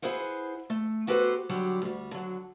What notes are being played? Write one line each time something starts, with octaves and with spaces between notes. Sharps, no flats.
E4 G#4 B4 C5 F#5
A3
B3 F#4 G4 A4 B4 C5
D3 F#3 G3 G4
D2 G3
D3 F#3